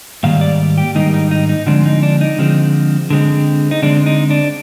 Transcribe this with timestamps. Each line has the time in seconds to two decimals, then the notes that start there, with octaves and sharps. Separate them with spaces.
0.23 G#2 D#3 G3 A#3 F5
0.41 D5
0.78 G4
0.95 G#2 D#3 G3 A#3 D#4
1.14 D#4
1.31 D#4
1.49 D#4
1.66 D3 F3 G#3 C4 D4
1.86 D#4
2.03 D4
2.21 D#4
2.38 D3 F3 G#3 C4
3.10 D3 G#3 C4
3.71 D#4
3.82 D3 G#3 C4 D4
4.06 D#4
4.30 D4